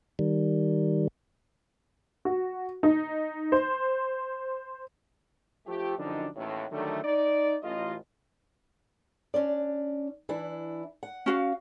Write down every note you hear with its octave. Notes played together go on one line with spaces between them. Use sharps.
D#3 G3
F#4
D#4
C5
F3 A3 G4
F#2 D3 F3 G3 D4 D#4
A1 D#2 A2
D3 D#3 F#3 G3 A3
D#4 D5
A1 F4 D#5
C#4 D4 D5
E3 D4 E4
F#5
C#4 F#4 F5